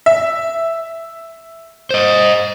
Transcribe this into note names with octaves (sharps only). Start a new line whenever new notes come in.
E5
C5 D#5